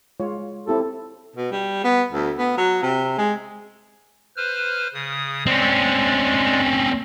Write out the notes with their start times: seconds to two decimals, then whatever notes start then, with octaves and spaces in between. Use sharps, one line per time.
0.20 G#3 F4 C#5
0.68 C4 E4 G4 A4
1.36 B2
1.51 G3
1.84 B3
2.12 D2
2.38 B3
2.57 F#3
2.82 C3
3.18 G#3
4.37 B4 C5 F6
4.94 C#3 D#6
5.46 G#3 C4 C#4 D5